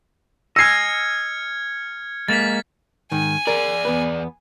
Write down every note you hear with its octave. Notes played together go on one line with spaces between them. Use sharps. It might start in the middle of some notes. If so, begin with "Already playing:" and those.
D#5 G#5 E6 F6 G#6 C7 C#7
G#3 A#3 A6 B6
G#2 D#3 G#5
G#4 A#4 D5
E2 B3 B4